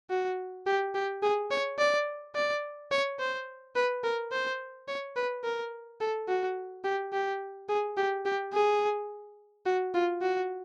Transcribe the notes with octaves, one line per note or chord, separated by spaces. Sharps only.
F#4
G4
G4
G#4
C#5
D5
D5
C#5
C5
B4
A#4
C5
C#5
B4
A#4
A4
F#4
G4
G4
G#4
G4
G4
G#4
F#4
F4
F#4